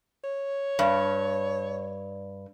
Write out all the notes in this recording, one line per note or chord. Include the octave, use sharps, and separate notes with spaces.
C#5
G2